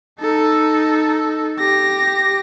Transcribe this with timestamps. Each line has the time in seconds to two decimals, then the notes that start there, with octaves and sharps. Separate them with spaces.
0.20 D#4 A4
1.59 G4 A#6